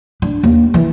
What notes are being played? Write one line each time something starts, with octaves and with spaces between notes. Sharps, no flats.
D4
D#2
E3